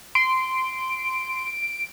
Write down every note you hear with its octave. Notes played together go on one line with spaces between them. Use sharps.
C6 D7